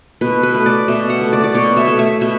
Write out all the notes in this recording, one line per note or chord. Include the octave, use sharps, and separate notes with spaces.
B2 B4
B4
A3
D5
B2 E5
F#5
A3
D5
D5
B2 C#5
E5
A3
E5
B2 E5